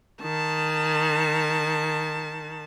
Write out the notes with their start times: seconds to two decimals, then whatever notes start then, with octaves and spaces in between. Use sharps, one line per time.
0.22 D#3 A5